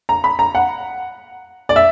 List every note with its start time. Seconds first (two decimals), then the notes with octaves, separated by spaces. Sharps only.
0.09 A#5
0.24 B5
0.39 A#5
0.55 F#5
1.69 D5
1.76 E5